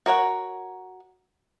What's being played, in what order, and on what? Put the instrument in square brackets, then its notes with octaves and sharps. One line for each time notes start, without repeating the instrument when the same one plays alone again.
[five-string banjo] F#4 A#4 C#5 F#5